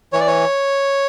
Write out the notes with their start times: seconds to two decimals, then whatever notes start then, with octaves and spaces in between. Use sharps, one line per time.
0.13 E3 C#5
0.20 D5
0.27 C#5